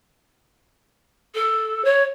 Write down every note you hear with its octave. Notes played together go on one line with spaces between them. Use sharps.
A4
C#5